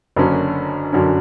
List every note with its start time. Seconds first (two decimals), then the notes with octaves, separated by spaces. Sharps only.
0.16 F#1 F#2 D3 F#3 C#4
0.92 F#2 D3 F#3 C#4